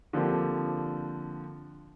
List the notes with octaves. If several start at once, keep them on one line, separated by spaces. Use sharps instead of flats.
D3 F3 A#3 C4 G4